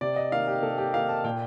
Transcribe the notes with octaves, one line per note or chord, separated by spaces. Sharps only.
C3 D5
D#5
D#3 A#3 D#4 F5
G4
C3 A4
G4
D#3 A#3 D#4 F5
A5
A#2 G5